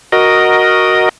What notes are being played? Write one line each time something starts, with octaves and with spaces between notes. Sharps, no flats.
F#4 A#4 D#5